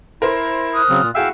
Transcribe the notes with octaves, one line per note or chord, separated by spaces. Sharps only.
E4 A#4 C5
D#6 F6 F#6
C#3 F#3 C4
A#2
E4 F#4 G#4 E5 F5 G5 E6